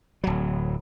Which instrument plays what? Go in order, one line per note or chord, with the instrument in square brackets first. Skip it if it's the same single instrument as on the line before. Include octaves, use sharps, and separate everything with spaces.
[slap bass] D1 F#3